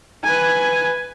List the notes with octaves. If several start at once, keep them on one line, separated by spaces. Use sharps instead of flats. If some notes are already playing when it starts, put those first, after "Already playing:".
B4 G#5